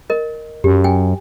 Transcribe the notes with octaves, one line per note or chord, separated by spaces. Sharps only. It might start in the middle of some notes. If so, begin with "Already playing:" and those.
A#4 D#5
F#2 G4
G5 G#5